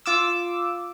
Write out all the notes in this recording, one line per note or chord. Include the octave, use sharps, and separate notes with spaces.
F4 D6 E6